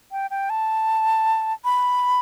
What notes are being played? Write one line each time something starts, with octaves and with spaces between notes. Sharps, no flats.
G5
G5
A5
B5